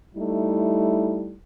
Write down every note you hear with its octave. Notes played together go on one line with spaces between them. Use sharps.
G3 A3 D#4 E4